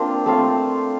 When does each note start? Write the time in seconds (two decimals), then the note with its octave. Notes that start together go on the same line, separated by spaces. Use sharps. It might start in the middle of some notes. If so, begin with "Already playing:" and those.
Already playing: A#3 C4 D4 F4 C5
0.26 A3 C4 F4